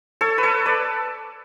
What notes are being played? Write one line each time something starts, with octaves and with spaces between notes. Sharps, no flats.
A4 C#5
B4
A4 C#5
B4 D5